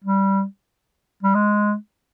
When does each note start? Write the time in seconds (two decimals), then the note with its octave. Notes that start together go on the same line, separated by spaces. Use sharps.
0.04 G3
1.23 G3
1.35 G#3